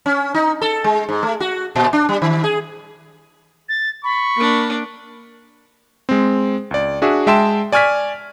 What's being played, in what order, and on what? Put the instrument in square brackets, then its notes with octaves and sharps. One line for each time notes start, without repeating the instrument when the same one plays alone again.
[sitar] C#4
D#4
A4
G#3
G#2
A3
F#4
A#2
D4
G3
D#3
G#4
[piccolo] A6
[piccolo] B5 [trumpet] C#6
[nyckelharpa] A#3 D4
[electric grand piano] G#3 C4
C#2 D5
D4 F#4 G#4 E5
G#3 E5 G5 A5 C6 E7
D5 G#5 C#6 F6 G#6 B6